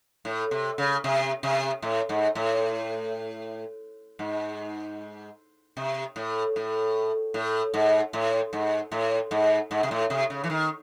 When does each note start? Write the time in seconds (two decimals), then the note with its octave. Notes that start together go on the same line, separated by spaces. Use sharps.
0.25 A2
0.51 C3
0.78 C#3
1.04 C3
1.43 C3
1.82 A2
2.09 G#2
2.35 A2
4.19 G#2
5.77 C3
6.16 A2
6.56 A2
7.34 A2
7.74 G#2
8.13 A2
8.53 G#2
8.92 A2
9.31 G#2
9.71 G#2
9.83 C3
9.91 A2
10.10 C3
10.30 C#3
10.44 E3
10.50 D#3